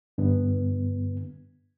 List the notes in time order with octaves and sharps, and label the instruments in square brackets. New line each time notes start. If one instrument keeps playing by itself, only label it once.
[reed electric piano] G2 D3 B3